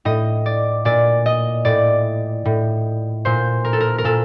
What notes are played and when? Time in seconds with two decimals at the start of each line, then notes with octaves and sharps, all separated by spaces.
0.05 A2 D#5
0.46 D5
0.85 A#2 D5
1.26 D#5
1.65 A2 D5
2.45 A2
3.25 A#2 C5
3.65 A#4
3.73 A4
3.80 A#4
3.98 A#4
4.04 A#2 A4